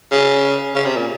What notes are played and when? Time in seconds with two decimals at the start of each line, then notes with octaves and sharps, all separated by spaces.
0.12 C#3
0.75 C#3
0.86 C3
0.97 A#2